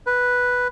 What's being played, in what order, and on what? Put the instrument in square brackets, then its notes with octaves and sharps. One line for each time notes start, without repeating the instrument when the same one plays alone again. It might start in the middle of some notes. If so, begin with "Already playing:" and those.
[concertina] B4